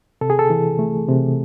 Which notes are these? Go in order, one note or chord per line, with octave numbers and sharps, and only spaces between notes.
C3 A4
G#4
A4
E3
A3
C3